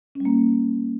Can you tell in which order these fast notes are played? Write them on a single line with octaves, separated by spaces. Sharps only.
C#4 G3 A#3